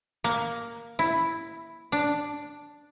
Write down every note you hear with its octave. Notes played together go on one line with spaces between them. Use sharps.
A#3
E4
D4